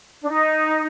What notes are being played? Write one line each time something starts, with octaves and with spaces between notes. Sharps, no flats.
D4
D#4